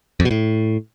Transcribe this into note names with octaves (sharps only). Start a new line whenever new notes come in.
F2
B2
A2